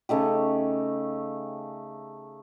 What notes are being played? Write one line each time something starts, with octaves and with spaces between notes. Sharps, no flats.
C#3 A3 D#4 G4